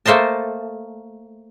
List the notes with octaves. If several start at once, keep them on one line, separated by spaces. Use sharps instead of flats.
A3 A#3 C5 D#5 A5